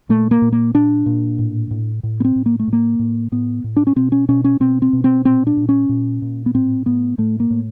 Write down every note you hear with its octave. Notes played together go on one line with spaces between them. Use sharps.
A#2 A3
A#3
A#2
A#3
A#2 D4
A#2
A2
A2
A2
B3
C4
A2
A#3
A3
A2
A#3
A2
A2 B3
A2
D4
C#4
B2 C4
C#4
B2 C#4
C#4
B2 C4
C4
B2
C4
A#2 C4
D4
A#2
C#4
A#2
A#2
B3
A2 C4
A2 B3
A2 A3
A#3
A2